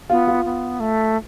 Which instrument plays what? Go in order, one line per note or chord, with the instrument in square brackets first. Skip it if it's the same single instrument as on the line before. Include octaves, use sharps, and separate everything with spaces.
[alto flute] B3 [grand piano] F4
[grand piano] F4
[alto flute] B3
A3